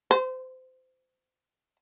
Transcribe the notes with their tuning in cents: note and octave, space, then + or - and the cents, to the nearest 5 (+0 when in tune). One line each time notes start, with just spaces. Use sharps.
C5 -25